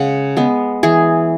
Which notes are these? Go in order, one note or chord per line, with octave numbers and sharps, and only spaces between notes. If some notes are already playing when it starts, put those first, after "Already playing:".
Already playing: C#3 G#3 F#5
G#3 B3
E3 G#4